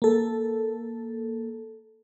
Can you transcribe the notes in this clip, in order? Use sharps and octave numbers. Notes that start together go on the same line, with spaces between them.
A#3 A4